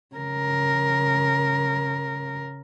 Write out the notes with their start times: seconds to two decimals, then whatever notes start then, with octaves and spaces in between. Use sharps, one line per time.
0.16 C#3 A#4